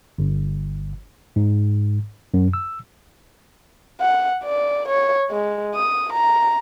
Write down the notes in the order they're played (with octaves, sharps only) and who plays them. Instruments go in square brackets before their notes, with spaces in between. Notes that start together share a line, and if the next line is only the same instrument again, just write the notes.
[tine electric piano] G1
G#2
F#2
E6
[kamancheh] F#5
D5
C#5
G#3
D#6
A#5